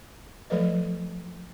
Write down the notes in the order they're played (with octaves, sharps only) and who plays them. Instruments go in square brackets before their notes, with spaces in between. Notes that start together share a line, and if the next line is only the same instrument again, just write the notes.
[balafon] F3 F#3 A3 A4 B4 D#5